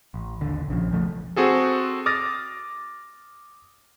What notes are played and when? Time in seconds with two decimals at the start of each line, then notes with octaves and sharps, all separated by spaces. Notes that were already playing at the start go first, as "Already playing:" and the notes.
0.14 A1
0.41 A1 D#2 D3
0.68 A#1 C#3 F3
0.91 E1 F3 A3
1.36 C4 F#4 G#4 A4
2.06 D6 D#6 F6 A6 A#6